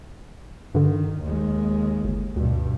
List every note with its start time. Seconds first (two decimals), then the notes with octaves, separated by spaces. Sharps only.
0.75 G2 D3 D#3
1.22 D#2 G#3
2.04 G1
2.36 D2 G2 B2